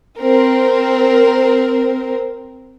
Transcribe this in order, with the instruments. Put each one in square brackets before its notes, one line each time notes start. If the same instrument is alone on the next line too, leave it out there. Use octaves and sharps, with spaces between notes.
[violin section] C4 A#4